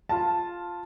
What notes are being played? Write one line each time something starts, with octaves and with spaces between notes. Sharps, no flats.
F4 A5